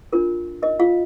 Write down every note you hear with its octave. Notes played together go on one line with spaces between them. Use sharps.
D4 F4 A#4
D#4 A#4 D#5
F4 F5